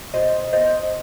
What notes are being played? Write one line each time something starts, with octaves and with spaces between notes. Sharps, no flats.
B2 C5 D#5
B2 C5 D#5